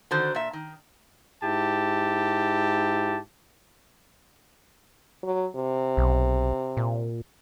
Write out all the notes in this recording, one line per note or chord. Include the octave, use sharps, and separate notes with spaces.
D3 D#3 F#4 C5
A#2 E5
D#3
G#2 E4 G4 A5
F#3
C3
B1
A#2